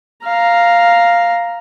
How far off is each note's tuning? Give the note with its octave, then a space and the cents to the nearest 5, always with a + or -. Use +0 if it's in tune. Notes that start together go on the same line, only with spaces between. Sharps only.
F5 +0 A#5 +0